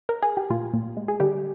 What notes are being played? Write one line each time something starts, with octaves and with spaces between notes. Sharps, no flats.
A#4
G#4
G4
A#2 F4
A#2
G#3
G#4
D3 G3 G4